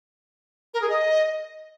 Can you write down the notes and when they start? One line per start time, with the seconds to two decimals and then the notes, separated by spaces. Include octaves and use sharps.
0.74 A#4
0.82 G#4
0.89 D#5